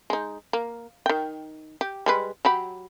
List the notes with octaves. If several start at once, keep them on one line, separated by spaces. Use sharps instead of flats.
G#3 D#4
A#3
D#3 G5
G4
G3 G#3 B4
F#3 G4 B5